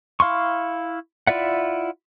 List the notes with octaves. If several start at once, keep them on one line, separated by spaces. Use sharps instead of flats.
E4 F5 C6 C#6
E4 F4 D5 E5 F#5